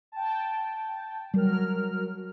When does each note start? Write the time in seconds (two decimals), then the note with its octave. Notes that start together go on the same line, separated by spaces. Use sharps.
0.12 G5 A5
1.34 F#3 G3 A#4 F6